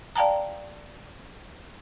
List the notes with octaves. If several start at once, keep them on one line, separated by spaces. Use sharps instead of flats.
D5 F5 G5 A5 A#5